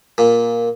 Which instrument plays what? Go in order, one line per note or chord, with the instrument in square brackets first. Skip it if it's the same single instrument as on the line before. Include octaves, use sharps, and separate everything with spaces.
[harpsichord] A#2